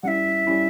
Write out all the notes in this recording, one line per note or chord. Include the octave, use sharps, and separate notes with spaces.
G3 C#4 E4 E5 F#5
G3 C#4 E4